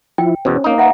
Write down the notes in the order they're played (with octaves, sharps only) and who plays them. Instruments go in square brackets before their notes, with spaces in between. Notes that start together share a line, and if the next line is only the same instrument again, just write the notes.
[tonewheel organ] F3 E4 [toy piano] G5
[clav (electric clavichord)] E2 B2 [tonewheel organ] C#4 [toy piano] C5
[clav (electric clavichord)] A#3 D#4
[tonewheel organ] B4 [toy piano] E5 F#5 A#5